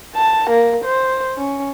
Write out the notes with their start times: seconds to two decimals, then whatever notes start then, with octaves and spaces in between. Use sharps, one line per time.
0.16 A5
0.50 A#3
0.85 C5
1.38 C#4